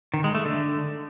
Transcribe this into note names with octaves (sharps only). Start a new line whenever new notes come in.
D#3
G#3
A3
D3